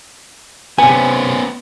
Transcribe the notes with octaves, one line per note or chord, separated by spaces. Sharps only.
C3 B3 C#4 G#5